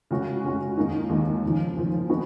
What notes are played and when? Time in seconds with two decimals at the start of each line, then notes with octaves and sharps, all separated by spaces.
0.11 C#3 G#3 C#4 F#4
0.44 C#3 G#3 C#4 F#4
0.77 D#2 D#3 G#3 D#4
1.09 D#2 D#3 G#3 D#4
1.44 D#2 C#3 F3
1.77 D#2 C#3 F3
2.09 F3 B3 D#4 F#4